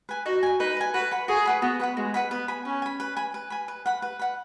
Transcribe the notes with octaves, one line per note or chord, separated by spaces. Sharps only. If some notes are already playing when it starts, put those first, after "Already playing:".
B4 G#5
D#4 F#4
B4 G#5
D#4 B4
B4 G#5
F#4 B4
B4 F#5 B5
F#4 G#4
B4 F#5 B5
B3 F#4
B4 F#5 B5
G#3 F#4
B4 F#5 B5
B3 B4
G#5 B5
C#4 B4
G#5 B5
B4
G#5 B5
B4
G#5 B5
B4
F#5 B5
B4
F#5 B5